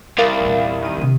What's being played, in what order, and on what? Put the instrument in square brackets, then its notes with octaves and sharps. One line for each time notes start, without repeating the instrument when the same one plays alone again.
[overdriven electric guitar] C2 [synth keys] A#4 F5 A6
[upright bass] E2 A#2
[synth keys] D#3 D#7
[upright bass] C3 C4